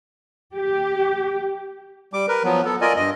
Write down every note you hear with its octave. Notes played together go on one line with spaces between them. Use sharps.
G4
G3 D6
A#4 B4
F3 F#3 B3
B3 A4
F4 A#4 D5 D#5 G#5
G2 D#5